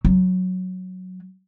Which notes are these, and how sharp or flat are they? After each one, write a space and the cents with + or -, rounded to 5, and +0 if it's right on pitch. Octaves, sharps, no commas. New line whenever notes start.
F#3 -5